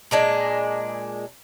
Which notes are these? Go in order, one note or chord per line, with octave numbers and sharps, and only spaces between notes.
A#2 G#3 D4